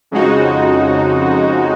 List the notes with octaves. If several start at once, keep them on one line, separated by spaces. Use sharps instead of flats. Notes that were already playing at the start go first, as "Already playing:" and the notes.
F2 C#3 G#3 D#4 F#4